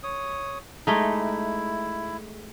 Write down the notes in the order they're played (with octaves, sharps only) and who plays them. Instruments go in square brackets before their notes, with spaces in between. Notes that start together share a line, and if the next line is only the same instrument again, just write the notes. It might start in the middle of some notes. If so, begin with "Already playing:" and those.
[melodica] C#5 D#6
[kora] G#3 A3 D#4 [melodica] E4